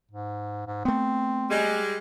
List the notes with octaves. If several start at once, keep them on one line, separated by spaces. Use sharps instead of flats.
G#2
G#2
A3 B3 C4
G3 G#3